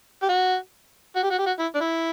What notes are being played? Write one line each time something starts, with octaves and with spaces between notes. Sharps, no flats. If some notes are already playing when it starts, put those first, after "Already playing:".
G4
F#4
F#4
G4
F#4
G4
F#4
E4
D4
E4